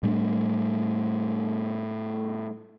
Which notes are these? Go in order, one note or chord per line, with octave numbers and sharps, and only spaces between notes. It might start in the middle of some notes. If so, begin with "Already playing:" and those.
A2 G3 A3 D4